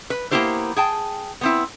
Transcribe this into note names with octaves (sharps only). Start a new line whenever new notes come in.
B4
A#3 B3 D#4 E4 G4 C5
G#4 G5 A5
B3 C4 E4